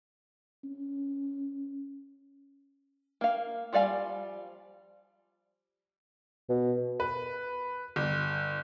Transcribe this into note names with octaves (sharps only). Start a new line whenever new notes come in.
C#4
A#3 F5
F3 G3 D5 F5 G#5
B2
B4
G1